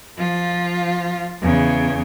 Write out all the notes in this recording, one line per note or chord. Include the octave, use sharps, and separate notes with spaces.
F3 F4
E2 C#3